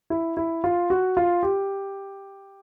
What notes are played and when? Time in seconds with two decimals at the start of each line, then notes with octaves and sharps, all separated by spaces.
0.10 E4
0.37 E4
0.64 F4
0.90 F#4
1.17 F4
1.43 G4